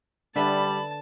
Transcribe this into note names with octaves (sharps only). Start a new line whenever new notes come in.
D3 G3 B4 E5 A5 B5